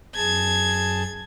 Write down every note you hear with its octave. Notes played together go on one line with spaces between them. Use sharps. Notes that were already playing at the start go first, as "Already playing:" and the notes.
F#2 G#4 A5 G#6